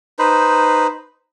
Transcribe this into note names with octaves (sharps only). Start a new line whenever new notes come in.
D#4 B4 C5